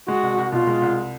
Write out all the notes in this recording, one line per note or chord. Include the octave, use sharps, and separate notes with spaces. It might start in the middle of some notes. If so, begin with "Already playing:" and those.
G#3 F#4
C2
C2
B2 F4
G#3
C2